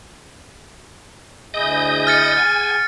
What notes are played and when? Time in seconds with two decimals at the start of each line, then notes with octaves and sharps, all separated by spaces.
1.54 D2 E4 G#4 D#5 D#6 G6
2.07 F6 A6 C#7
2.37 G#4 F#5 G#5